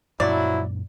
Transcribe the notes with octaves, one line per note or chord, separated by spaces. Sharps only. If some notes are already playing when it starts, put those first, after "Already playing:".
F#2 A#2 F3 F#3 D4 E4 D5